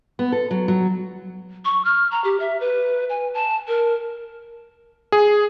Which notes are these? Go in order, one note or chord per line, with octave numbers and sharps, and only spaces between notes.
B3
A4
F#3
F#3
C#6
F6
A#5
G4
E5
B4
G#5
A5
A#4
G#4